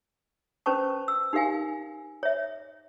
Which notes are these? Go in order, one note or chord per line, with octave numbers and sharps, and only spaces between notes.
C#4 B4 C5 A5 C#6
E6
D#4 G4 A#4 F5 G#5
C#5 E5